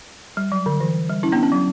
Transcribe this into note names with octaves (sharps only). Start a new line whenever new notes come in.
G3
F#3
D3
E3
G3
C#4 E4
B3 D4
C#4
F#3